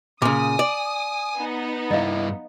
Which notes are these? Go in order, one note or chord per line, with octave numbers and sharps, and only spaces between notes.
A#2 C#3 G#5 D6 D#6
D5
B3 D#4
G2 E4 D#5 F5